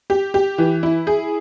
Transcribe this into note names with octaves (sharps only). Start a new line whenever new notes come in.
G4
G4
E3
E4
G#4